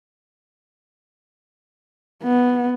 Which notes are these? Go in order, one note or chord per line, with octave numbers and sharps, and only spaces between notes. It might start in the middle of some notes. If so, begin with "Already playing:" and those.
B3